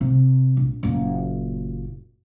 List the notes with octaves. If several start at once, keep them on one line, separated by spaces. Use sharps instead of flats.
C3
A#1
F#1 A#2